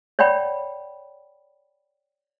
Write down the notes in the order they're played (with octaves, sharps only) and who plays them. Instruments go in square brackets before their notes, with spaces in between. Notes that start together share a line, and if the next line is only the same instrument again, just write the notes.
[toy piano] C#5 D5 F#5 G5 B5